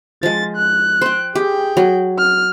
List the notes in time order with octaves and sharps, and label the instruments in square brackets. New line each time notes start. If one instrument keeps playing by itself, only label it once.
[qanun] F3 G#3 [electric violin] A6
[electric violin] F#6
[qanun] C5 G5
[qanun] G4 [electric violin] G#4 G5
[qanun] F#3
[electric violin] F6